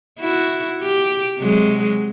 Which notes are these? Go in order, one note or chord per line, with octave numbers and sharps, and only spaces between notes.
E4 F#4
G4
C3 F#3 G#3